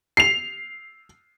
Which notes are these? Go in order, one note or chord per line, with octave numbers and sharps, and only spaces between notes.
C7 F7